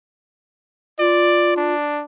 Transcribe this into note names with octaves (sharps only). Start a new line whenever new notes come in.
F4 D5
D4